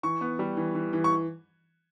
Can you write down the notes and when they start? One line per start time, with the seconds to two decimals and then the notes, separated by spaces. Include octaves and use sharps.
0.03 E3 C#6
0.21 B3
0.39 G3
0.57 E3
0.75 E3
0.93 E3
1.04 C#6